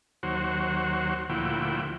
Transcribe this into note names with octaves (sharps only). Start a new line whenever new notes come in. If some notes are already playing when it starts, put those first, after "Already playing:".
D#2 F#3 F#4 C5
D2 A#2 F3 E4 F#4 G5